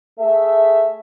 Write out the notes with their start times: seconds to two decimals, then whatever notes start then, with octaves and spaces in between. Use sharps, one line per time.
0.19 A3 G#4 A4 E5